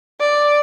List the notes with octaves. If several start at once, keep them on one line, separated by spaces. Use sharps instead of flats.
D5